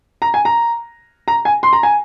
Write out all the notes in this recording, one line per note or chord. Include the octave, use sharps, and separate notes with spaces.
A#5
G#5
A#5
A#5
G#5
C6
A#5
G#5